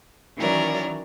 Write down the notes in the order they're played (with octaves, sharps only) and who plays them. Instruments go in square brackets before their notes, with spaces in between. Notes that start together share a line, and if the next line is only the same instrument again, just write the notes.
[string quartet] D#3 E3 F#3 C#4 A#4 D5